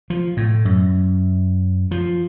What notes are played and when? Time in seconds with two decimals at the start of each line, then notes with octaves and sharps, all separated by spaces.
0.10 F3
0.37 A2
0.65 F#2
1.91 F3